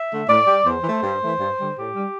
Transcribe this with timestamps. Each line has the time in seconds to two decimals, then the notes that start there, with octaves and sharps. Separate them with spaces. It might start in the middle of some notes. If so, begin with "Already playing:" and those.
Already playing: E5
0.10 D3 A3
0.28 A2 D5
0.47 G3
0.66 E2 C5
0.84 E3
0.89 A3
1.03 G2
1.21 E3 A3
1.40 G2
1.59 D3 G3
1.76 A2 G4
1.96 G3